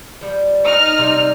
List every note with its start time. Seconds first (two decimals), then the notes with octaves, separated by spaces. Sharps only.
0.21 F3 G3
0.64 D#4 F6
0.98 C3 G3